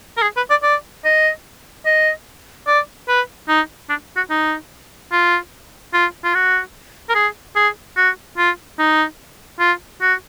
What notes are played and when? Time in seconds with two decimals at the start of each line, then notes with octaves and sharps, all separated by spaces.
0.17 A#4
0.22 G#4
0.37 B4
0.50 D5
0.63 D5
1.05 D#5
1.86 D#5
2.67 D5
3.08 B4
3.48 D#4
3.89 D4
4.16 F#4
4.30 D#4
5.12 F4
5.93 F4
6.24 F4
6.35 F#4
7.09 A#4
7.15 G#4
7.56 G#4
7.97 F#4
8.38 F4
8.79 D#4
9.60 F4
10.02 F#4